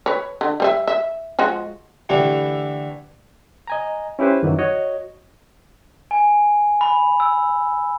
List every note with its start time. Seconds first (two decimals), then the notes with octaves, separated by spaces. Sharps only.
0.06 B4 C#5
0.41 D3
0.60 G3 C5 E5
0.87 E5
1.39 F3 G#3 F#4
2.09 D3 E3 A3 E4 G4
3.67 D#5 G#5 A#5
4.19 C#4 E4 G4 B4 C5
4.43 F#2 D#3 E3 F#3
4.59 F#4 C#5 D#5
6.11 G#5
6.81 B5
7.20 E6